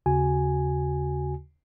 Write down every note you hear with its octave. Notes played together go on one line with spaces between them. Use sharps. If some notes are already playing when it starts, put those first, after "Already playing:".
D#2 C#3 F#4 G#5